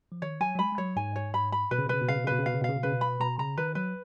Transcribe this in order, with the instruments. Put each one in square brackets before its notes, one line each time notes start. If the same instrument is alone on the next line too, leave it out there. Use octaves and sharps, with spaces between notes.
[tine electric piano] F3
[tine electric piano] D#3 [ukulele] C#5
[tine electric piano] F#3 [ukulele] G#5
[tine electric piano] F#3
[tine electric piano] G#3 [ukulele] B5
[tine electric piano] G#3
[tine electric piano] F#3 [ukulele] C#5
[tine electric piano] G#2 [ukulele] G#5
[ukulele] C#5
B5
B5
[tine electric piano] B2 [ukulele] B4
[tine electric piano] C#3
B2
[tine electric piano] C#3 [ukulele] B4
[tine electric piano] B2
[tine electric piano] C#3 [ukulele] F5
[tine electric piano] B2
C#3
[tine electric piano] B2 [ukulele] B4
[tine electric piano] C#3
[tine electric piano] B2 [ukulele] F5
[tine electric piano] C#3
B2
[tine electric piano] C#3 [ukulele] F5
[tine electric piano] B2
[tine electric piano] C#3 [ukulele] B4
[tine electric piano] B2
[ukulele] B5
[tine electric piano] B2 [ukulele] A#5
[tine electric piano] C#3 [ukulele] A#5
[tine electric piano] D#3 [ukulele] B4
[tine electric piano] F#3 [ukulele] B4